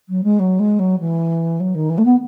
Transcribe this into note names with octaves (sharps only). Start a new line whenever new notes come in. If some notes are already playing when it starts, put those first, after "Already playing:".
F#3
G#3
F#3
G#3
F#3
E3
F#3
D#3
E3
A3
B3